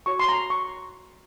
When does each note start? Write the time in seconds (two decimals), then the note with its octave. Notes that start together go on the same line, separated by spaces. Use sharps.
0.06 F#4 C#5 C#6
0.19 C6
0.29 A#5
0.50 C#6